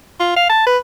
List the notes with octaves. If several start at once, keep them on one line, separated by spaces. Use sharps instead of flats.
F4
F5
A5
B4